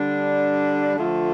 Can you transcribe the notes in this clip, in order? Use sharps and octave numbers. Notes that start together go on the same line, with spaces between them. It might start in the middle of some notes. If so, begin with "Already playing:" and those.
Already playing: D3 G3 D4
D3 F3 A3 F4